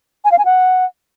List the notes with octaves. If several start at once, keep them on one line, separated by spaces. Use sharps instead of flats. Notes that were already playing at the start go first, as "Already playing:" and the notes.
G#5
F5
G#5
F#5